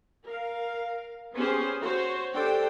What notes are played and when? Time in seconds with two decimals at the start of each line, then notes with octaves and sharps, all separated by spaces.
0.25 A#4 F5
1.34 B3 C#4 G4 G#4 C5
1.84 F#4 C5 C#5
2.33 D4 G4 A4 C5 G5